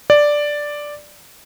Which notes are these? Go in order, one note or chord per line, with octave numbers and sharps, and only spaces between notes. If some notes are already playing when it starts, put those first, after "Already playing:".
D5